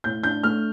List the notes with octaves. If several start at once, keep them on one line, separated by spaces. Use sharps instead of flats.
A2 G6
D4 G6
A3 F6